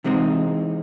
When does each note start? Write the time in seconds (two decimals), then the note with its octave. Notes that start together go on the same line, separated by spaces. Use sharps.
0.04 C3 E3 G#3 C4 D#4